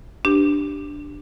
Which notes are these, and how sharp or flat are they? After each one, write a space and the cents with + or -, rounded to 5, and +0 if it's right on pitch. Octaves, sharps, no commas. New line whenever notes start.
D4 +0 G4 +0 B4 +0